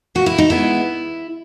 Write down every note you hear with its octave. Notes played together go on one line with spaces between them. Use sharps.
A#2 F#4
E4
D#4
G#3 B3 E4